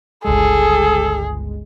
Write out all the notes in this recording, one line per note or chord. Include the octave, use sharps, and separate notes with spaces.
G1 C#2 G#3 G#4 A4